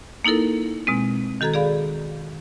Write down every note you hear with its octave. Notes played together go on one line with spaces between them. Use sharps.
A#3 D#4 E4 A4 A#4
B2 G#3 C4
D#3 F#4 A4 A#5 G#6
G#4 D5 F5 B5